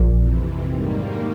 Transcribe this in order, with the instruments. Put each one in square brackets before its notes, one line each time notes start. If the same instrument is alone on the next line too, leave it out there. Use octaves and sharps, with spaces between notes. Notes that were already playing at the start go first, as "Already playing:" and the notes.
Already playing: [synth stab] A#1 A#2
[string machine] F2 C3 E3
G#2 D#3 G3 A#3